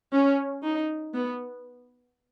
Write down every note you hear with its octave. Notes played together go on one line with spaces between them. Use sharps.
C#4
D#4
B3